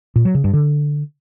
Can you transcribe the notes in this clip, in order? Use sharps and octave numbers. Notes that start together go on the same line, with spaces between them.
A#2
F#3
C#3
G2
D3